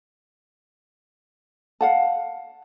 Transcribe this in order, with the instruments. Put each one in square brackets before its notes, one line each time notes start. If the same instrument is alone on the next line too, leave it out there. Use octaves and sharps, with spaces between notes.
[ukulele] F5 F#5 A5